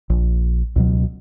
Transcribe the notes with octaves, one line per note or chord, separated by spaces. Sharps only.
A#1
C#2 B2 F#3